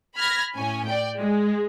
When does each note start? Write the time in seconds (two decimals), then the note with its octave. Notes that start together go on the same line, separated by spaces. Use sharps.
0.17 B5 F6 G#6 A#6
0.54 A2 C#4 G#5
0.85 D5 G5
1.19 G#3